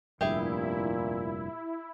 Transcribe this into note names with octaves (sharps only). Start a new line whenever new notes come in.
F1 G2 A#2 E4 G4 G#4 E5